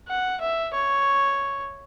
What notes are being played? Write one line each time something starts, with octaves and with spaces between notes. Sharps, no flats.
F#5
E5
C#5